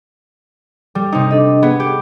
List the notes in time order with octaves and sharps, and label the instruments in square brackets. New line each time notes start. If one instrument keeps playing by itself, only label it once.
[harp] G3
C3 D#4
[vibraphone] D4 A4 D#5
[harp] B3 [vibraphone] G#4
[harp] G4